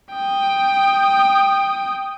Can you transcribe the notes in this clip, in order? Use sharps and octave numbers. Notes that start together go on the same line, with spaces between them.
G5 D#6